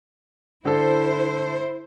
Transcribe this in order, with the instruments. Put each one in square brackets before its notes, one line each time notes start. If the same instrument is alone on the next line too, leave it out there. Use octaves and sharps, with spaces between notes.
[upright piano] D3 A4 [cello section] E4 C5